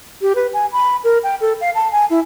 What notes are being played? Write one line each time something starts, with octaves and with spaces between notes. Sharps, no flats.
G4
B4
G#5
B5
A#4
G5
A4
F5
A5
G#5
E4